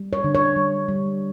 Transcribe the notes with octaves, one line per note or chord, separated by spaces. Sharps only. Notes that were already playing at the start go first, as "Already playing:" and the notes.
Already playing: G3
C#5
D3
C#5
G3
G3